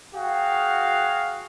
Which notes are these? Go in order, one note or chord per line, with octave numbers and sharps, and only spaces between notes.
F#4 G#4 F5 G5